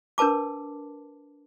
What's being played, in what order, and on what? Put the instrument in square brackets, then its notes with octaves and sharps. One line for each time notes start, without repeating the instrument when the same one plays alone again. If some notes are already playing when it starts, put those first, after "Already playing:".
[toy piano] D4 A#4 B4 A5 D6